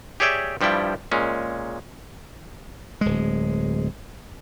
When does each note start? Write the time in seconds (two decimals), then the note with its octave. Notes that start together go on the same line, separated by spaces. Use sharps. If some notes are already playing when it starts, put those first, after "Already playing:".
0.20 G4 G#4 C#5 D5 E5 G5
0.61 G2 F3 G3 E4 G5
1.12 A#2 G#3 C#4
3.01 D1 G#3